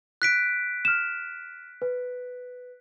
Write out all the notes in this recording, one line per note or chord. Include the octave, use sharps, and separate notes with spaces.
F#6 B6 D7
F6 E7
B4